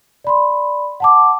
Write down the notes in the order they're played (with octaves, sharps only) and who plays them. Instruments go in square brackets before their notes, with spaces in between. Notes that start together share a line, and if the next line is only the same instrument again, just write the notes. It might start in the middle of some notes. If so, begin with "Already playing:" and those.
[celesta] D5 B5 C6
F#5 A5 D6